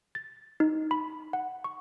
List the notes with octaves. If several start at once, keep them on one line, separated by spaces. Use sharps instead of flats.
A6
D#4
B5
F#5
C#6